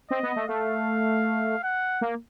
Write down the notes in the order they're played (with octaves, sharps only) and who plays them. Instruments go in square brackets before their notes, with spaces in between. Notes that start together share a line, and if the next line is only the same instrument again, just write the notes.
[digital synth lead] C4 [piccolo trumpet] D#5
[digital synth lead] B3
A3
[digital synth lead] A3 [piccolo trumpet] F5
[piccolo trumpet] F#5
[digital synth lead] A#3